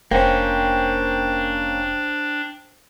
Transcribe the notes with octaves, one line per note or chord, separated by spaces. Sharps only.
F1 A#3 C#4 D4 C5 G5